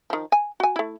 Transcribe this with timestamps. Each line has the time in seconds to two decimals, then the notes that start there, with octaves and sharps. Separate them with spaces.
0.10 D#3 F3
0.32 G#5
0.60 F#4 G#5
0.76 A3 E4